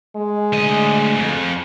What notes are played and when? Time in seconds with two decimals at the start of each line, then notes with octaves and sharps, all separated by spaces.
0.16 G#3
0.53 D2 D#5
1.18 F2